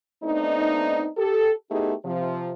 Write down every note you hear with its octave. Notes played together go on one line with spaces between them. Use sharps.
A3 B3 C4 D4 D#4
G4 A4
A3 B3 D#4 E4 G4 G#4
C3 F3